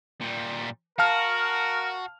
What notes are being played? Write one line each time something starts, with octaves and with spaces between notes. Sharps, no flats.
A#2 G3
F#4 A#4 F5 A5 F6